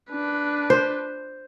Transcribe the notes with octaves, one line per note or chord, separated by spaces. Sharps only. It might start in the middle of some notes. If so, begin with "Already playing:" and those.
D4 B4
C5